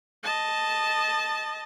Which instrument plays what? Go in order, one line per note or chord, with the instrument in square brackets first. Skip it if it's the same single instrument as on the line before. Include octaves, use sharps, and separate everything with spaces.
[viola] D#5 A5